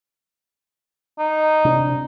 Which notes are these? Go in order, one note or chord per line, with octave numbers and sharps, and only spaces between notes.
D#4
C3 D4